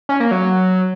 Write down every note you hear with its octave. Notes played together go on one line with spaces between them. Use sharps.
C#4
A#3
F#3